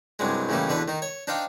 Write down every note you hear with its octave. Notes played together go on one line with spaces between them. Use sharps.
C2 G2 F#3 G#3
A2 C#3 E3 G3 A#3 D#4
E2 B2 D3 D4 B4 F#5
D#3 D#4
C#5
D4 D#4 C5 F5 G5